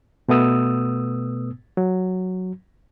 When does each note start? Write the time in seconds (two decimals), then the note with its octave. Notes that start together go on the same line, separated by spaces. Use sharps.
0.29 B2 A3 B3 D#6 E6
1.77 F#3